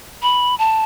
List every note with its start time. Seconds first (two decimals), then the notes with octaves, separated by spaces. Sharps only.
0.22 B5
0.59 A5